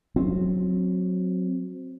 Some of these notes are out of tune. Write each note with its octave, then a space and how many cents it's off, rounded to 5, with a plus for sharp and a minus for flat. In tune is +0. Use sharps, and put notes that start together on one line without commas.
F#3 -15 C4 +0